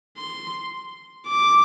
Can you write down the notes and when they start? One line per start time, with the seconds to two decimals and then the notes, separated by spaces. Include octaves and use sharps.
0.18 C6
1.28 D6